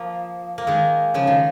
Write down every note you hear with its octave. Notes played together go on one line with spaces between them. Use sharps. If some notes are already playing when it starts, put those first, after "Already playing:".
Already playing: F3 A#3
A#3
D#3 G#3
C#3 F3
D#3